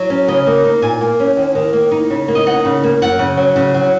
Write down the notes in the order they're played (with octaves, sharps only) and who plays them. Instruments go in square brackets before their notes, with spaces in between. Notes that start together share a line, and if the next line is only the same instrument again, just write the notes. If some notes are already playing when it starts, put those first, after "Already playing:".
Already playing: [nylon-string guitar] F#3
C#4
C#3 D#5
A#3
D#4
A#2 G#5
A#3
C#4
D#2
D#3
A#3
D#4
C#3
A#3
D#5
D#4 F#5
C#3
A#3
F#2 F#5
C#3
F#3
C#3
F#3